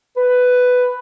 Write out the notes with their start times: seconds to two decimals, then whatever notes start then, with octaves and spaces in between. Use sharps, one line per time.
0.17 B4